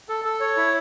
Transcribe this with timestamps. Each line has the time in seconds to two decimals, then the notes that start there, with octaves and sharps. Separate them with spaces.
0.09 A4
0.25 A4
0.40 C#5
0.57 E4